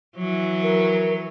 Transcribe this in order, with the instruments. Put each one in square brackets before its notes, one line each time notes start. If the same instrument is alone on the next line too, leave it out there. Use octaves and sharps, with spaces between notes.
[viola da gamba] E3 F#3
[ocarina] A#4